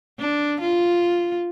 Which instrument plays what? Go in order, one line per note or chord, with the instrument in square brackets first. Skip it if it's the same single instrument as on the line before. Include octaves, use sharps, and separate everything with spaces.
[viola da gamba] D4
F4